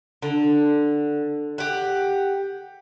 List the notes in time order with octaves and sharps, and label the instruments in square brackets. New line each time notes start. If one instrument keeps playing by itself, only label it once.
[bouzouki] D3
G4 F#5